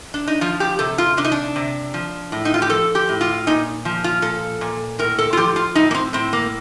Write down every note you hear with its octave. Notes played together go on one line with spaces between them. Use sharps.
D4
D#4
F3 F4
G4
C3 A4
F4
C3 D4
D#4
D4
C3
F3
A2
D#4
F4
G4
F3 A4
G4
A2
F4
A#2 D#4
F3
F4
A#2 A4
A#2
A2 A#4
A4
F4
F3 G4
F4
A2 D#4
A#3
C4
A2 C4
A#3